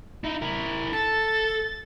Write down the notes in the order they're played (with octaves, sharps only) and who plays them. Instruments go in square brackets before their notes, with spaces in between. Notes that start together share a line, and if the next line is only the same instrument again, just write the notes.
[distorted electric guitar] D#4 E4
E4 A#4
[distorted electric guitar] A4 [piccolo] A6